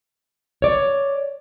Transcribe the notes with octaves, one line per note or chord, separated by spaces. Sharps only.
C#5 D5